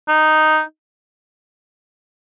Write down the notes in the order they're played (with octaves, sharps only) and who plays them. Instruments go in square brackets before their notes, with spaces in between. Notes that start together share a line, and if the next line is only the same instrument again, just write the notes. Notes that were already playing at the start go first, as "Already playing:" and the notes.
[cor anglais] D#4